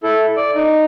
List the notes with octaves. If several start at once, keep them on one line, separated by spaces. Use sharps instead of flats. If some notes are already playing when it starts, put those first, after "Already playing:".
E4 A4
D5
D#4